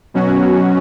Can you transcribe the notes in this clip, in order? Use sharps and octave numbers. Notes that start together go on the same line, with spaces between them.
B2 F#3 C#4 F#4